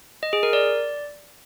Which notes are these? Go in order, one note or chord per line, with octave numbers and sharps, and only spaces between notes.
D#5
G#4
A#4
D5